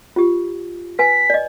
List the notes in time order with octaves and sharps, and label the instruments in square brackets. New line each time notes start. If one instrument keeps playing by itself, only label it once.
[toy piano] F4 G4
[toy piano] B4 G#5 [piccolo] B6
[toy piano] D5 D#5